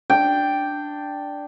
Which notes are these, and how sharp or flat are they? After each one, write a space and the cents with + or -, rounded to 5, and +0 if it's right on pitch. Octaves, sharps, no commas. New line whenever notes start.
D4 +0 G5 +0